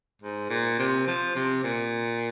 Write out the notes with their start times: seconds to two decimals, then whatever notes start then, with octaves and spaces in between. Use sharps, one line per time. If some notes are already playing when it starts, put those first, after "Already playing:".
0.22 G#2
0.50 A#2
0.79 C3
1.07 F3
1.36 C3
1.64 A#2